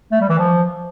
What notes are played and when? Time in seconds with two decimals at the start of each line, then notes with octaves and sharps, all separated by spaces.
0.12 A3
0.21 G3
0.29 E3
0.38 F3